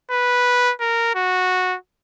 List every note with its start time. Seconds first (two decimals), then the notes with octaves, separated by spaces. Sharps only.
0.11 B4
0.80 A#4
1.15 F#4